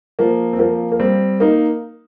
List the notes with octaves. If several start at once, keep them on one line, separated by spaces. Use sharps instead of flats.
F3 A#3
C4
F3 A#3
A#3
G3 C4
A#3 D#4